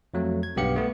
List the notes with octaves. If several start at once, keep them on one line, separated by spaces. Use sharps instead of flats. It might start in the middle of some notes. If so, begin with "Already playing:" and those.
F2 F#3 A3
G#6
B1 G2 B3 G4 F5 C#7
A3 B3